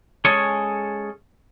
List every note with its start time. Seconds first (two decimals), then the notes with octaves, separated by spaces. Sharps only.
0.25 G#3 C#4 G#4 A4 C#5